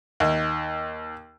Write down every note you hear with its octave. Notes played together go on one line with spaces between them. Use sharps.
D#2